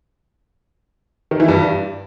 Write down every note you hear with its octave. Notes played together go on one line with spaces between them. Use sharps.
D#3
E3
G2